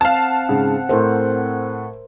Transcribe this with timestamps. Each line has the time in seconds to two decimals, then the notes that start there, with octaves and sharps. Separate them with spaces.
0.01 C4 F5 F#5 A5
0.49 G#2 C#3
0.89 A2 A3 A#4 C5